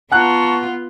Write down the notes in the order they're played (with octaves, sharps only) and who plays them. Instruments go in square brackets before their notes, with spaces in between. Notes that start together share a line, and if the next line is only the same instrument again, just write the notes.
[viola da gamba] B3 F4 [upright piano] F#5 F#6 [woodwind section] A5 A#5 C#6